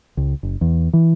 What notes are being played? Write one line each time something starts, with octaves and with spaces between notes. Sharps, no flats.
C#2
F#1
E2
E3